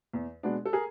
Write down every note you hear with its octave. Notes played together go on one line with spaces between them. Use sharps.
E2
B2 G#3 B3 D4
A4
G#4 A#4